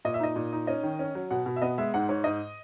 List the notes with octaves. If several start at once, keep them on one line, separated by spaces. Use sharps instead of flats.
A#2 D#5
E5
D#4 D#5
A#2
D#4
C#4 D#5
D#3
C#4
F#3
B2 F#5
B2
E5
B3 D#5
G#3 E5
G#2 F#5
G#2 C#5
G#2 D#5